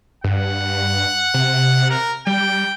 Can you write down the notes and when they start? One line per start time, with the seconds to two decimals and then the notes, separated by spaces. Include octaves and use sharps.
0.24 G2 F#5
1.34 C3
1.90 A#4
2.27 G3 G5